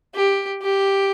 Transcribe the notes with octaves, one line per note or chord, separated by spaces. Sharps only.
G4
G4